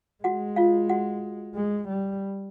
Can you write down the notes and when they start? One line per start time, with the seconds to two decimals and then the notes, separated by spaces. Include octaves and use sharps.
0.24 G#3 F#4 F#5
0.56 F4 F5
0.89 F#4 F#5
1.55 G#3
1.89 G3